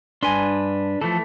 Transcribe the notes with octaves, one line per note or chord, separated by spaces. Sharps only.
G2 D4 B4 G#5 C6
E3 F3 A3 A4